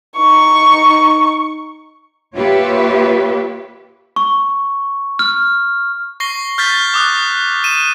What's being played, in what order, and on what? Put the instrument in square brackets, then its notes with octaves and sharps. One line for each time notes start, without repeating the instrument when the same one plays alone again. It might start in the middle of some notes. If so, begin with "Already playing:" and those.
[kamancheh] D#4 C#6
[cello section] A#3 F4 G4 B4 C#5 E5
[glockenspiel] C#6
F6
[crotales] C#6 A#6 C7 G7
F6 G6 A6 B6
D6 D#6 F#6
D#7 E7